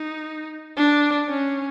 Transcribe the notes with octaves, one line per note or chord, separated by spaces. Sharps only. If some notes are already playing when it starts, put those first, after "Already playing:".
Already playing: D#4
D4
C#4